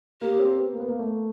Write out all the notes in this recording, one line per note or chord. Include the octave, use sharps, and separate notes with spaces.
A#3 G4
C4
B3
A#3
B3
A#3
A3